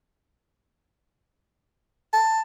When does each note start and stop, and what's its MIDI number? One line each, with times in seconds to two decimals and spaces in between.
2.13 2.41 81